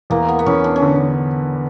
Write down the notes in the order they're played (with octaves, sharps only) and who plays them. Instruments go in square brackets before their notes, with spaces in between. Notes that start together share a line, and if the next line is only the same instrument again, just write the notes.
[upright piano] E2 [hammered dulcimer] A#3
[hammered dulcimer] B3
B3
[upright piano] E2 [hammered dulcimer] C#4
[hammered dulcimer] D4
C#4
[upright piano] D3